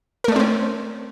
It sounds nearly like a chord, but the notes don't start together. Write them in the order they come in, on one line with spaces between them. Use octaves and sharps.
A#4 A3 D5 C4 C#4